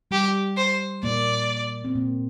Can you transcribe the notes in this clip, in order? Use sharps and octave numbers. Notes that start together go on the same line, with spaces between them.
G3 G4
C5
A#2 A#3 D5
C4
A#2 A#3